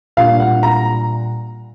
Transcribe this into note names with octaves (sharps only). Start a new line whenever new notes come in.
A#2 G3 A#3 D4 F5
F#5
A#5